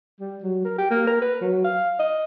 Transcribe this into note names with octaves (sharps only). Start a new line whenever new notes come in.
G3
F#3
A#4
G4
A#3
A#4
B4
F#3
F5
D#5